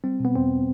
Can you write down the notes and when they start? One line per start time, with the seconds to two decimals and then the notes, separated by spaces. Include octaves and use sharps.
0.04 G3 C4
0.20 B2 B3
0.36 E2 C4